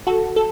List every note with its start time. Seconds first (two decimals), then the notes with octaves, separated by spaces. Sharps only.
0.07 F#4 A4
0.36 A4